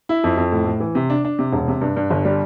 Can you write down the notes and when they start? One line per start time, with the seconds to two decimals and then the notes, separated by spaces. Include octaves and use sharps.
0.09 E4
0.24 F2
0.37 F2
0.52 A2
0.66 A2
0.80 E3
0.95 C3
1.10 D4
1.25 D4
1.39 C3
1.53 E1
1.68 C3
1.81 G2
1.97 G2
2.11 G1
2.25 G3